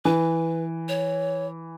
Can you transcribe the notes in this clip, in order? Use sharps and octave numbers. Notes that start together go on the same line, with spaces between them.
E3 B4
C#5